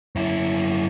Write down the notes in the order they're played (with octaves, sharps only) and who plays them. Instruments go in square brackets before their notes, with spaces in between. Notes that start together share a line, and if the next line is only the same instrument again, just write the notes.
[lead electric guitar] F#2 E4